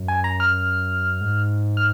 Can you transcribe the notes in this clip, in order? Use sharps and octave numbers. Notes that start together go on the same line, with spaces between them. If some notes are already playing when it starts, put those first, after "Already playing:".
Already playing: F#2
G#5
A#5
F6
G#2
F6